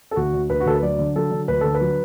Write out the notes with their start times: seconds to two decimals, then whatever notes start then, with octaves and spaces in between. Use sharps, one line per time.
0.11 A4
0.16 D2 F#4
0.33 D3
0.50 D2 B4
0.60 F#4
0.66 D2 A4
0.75 B4
0.82 F#3 D5
0.99 D3
1.16 F#3 A4
1.32 D3
1.48 D2 B4
1.61 D3 A4
1.74 B4
1.81 F#3